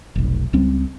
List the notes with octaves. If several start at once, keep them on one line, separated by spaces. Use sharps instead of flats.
F1 B1
C#2 G3 C4 C#4